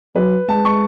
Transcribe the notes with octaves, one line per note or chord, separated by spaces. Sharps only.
F#3 B4
G#3 A5
C#6